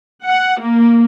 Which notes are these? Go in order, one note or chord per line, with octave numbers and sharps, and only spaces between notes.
F#5
A#3